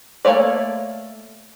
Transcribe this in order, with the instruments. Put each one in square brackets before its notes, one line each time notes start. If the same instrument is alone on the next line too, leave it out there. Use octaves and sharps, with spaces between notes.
[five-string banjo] A3 A#3 C#5 D5